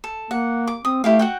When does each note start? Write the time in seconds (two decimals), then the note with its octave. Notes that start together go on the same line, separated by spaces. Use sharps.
0.04 A4
0.31 A#3 F#5
0.67 D6
0.85 C4 D#6
1.04 A3 E4 G4 F5
1.19 F#4 F#5 G5